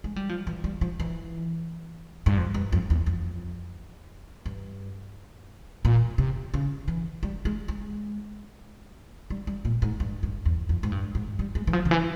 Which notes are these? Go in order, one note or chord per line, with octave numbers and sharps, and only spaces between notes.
G#3
G3
F3
E3
G3
F3
E3
G2
F2
G2
F2
E2
F2
G2
A#2
C3
C#3
E3
G3
G#3
G#3
G3
G3
A#2
G#2
G2
G2
E2
F2
G#2
G2
G#2
G3
G#3
E3
F3
C#3
E3